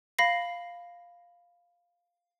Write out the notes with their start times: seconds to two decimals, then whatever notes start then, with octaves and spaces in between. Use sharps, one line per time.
0.19 F5 B5 A#6 C7